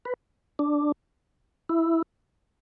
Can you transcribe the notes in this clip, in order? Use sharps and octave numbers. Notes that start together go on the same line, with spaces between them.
B4
D4
E4